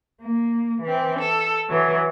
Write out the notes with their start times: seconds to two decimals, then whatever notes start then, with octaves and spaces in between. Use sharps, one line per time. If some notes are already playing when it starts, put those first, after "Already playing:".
0.22 A#3
0.84 E3 C4
1.19 A4
1.69 E3 F#3